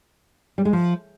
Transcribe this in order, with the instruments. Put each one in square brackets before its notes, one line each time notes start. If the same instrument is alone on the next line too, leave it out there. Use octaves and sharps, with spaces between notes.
[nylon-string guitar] G3
G#3
F3